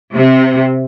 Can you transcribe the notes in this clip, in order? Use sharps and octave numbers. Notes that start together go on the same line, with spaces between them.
C3